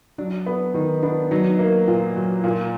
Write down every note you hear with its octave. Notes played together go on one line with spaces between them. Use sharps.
F#3 D4
B3
D#3 D#4
B3 D4
F#3 D#4
A#3
A#2 F4
F#3
A#2